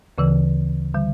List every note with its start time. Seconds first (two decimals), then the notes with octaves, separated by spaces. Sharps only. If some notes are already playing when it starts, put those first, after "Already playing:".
0.18 D2 C#3 E3
0.94 D3 G3